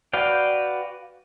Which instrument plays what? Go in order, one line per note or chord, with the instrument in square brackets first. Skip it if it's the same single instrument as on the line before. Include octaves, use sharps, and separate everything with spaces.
[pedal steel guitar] F#4 B4 D5 F5 G5